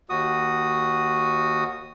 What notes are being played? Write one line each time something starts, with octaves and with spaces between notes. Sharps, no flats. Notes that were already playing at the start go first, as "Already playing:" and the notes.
D#2 F#4 D#6